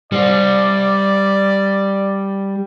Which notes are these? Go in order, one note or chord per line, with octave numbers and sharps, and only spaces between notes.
G3 C5 D5